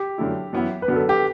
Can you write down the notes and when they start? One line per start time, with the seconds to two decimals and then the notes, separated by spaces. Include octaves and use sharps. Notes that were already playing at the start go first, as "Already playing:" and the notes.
Already playing: G4
0.18 F#2 D3 A3 E4
0.53 F#2 E3 B3 E4
0.82 B4
0.88 F#2 D3 F#3 B3 D4
0.96 A4
1.09 G4